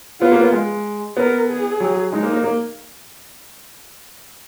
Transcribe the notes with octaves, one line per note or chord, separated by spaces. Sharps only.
B3 F4
A#3
B3
G#3
B3 A#4
G#4
F#3
G#3 D#4
A#3
A#3
A#3